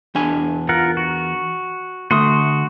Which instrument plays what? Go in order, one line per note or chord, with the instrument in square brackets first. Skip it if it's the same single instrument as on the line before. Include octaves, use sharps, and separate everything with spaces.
[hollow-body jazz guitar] E2 D4 G#5
[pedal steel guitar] F4 A#4 F#5
F#4
[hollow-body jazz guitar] D2 A3 [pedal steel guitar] F#4 C6 D#6